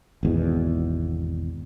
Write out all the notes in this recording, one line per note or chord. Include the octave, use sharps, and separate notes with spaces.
G#1 E2 B2